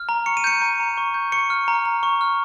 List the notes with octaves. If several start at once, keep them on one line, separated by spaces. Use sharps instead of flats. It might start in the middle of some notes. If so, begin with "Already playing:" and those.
Already playing: F6
A#5
C#6 C#7
D#7
G6 C#7
A#5
A#5
C#6
G6
C#6 C#7
F6
A#5
A#5
C#6
F6